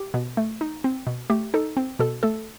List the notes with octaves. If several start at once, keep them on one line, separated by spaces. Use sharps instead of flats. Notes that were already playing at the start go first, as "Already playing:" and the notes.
Already playing: G4
B2
A3
D#4
C4
B2
A3 G4
D#4 A4
C4
B2 A4
A3 A4